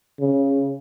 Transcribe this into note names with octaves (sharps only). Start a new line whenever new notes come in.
C#3